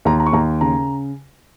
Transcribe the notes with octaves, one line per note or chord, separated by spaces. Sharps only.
D#2 A#5
A#5
C#6
D#2 A#5
C#3 A#5